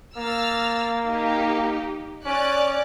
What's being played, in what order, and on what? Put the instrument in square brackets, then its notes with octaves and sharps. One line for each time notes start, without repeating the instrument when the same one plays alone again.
[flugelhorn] A#3 [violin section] E6 F6 A6
[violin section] D#4 G4
[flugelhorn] C#4 [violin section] D5 F#6